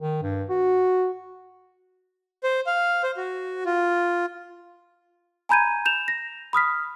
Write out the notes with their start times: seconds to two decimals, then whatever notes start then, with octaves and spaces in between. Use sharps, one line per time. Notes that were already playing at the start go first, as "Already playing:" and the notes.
0.02 D#3
0.22 G2
0.49 F#4
2.43 C5
2.66 F5
3.03 C5
3.17 F#4
3.66 F4
5.49 G#5 A#5 B5 G6 G#6 D#7
5.86 G6 E7 F7
6.08 A#6
6.53 B5 D#6 F6 B6